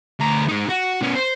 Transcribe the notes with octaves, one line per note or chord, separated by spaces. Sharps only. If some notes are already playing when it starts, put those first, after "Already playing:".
D2 A#5
G#3 D#4
F#4
B3 C#4
C5